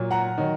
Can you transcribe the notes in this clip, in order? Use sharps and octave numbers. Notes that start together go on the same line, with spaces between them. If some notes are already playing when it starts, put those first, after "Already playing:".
Already playing: A#2 F#3
F#5 A#5
D#3 F#3